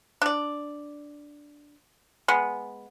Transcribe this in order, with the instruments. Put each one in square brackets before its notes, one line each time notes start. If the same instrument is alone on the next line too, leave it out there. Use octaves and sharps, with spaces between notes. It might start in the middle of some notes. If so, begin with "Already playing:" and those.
[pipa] D4 D5
G#3 B3